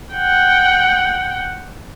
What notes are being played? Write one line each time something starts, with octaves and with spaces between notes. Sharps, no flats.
F#5 G5